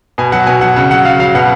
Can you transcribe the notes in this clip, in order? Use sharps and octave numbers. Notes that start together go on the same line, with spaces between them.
B2 G#5
F#3 F#5
B2 G#5
F#3 F#5
C#3 F#5
F#3 F#5
C#3 F5
F#3 F5
B2 F#5